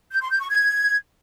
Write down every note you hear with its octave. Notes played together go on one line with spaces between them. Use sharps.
G6
C6
G6
C#6
G#6